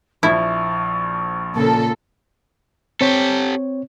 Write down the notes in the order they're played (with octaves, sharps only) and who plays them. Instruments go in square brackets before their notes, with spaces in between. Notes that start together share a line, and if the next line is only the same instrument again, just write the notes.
[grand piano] A#1 F3 [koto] E4 [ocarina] C#6
[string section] A#2 C#3 A4
[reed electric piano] C4 C#5 [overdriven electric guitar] G4 A4